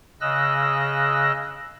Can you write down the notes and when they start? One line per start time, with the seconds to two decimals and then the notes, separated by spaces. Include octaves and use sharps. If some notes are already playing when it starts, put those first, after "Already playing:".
0.21 C#3 D#5 E6 F#6 A#6